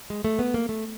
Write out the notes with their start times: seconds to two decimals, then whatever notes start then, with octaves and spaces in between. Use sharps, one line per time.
0.10 G#3
0.24 A3
0.39 B3
0.54 A#3
0.69 A3